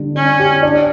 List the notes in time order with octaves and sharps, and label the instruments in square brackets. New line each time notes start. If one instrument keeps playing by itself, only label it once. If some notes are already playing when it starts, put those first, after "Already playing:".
Already playing: [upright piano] D3 G3
[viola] C#4 [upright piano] D4
[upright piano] G4
D4